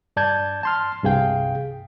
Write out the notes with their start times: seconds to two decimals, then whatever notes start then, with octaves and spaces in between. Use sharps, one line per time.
0.17 G2 D5 A5 G6 G#6
0.63 A5 C6 F6
1.03 C2 G2 C3 G#4 F5 G5